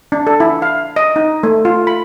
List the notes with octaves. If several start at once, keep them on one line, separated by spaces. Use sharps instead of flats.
D4
A4
E4
F5
D#5
D#4
A3
F4
B5